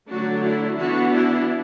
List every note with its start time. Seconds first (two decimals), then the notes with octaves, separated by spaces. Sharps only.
0.09 D3 F#3 A3 D4 F#4
0.44 E4
0.79 E3 B3 D4 F#4
1.14 E4